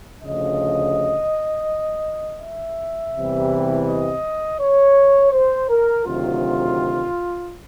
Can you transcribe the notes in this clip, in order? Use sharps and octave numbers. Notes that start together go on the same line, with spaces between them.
D2 C#3 F3 D#5
E5
E2 C3 E3 G3
D#5
C#5
C5
A#4
D2 C3 D#3 F#3 F4